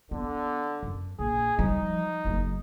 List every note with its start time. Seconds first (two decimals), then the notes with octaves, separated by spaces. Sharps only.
0.11 D3 B3
0.83 F#2
1.19 A#1 G#4
1.58 F3 G3 D#4
2.25 F#1 F#2